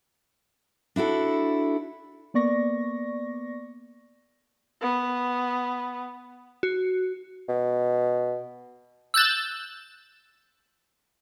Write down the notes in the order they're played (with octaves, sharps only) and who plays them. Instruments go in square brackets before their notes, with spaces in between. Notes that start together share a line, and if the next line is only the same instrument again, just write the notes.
[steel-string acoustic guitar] D4 E4 F#4 A4
[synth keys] A#3 B3 D5 C#6 A#6
[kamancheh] B3
[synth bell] F#4
[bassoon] B2
[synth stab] E6 F#6 G6 A6